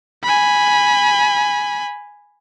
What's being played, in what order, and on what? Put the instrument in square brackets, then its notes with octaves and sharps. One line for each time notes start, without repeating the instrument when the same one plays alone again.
[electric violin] G#5 B5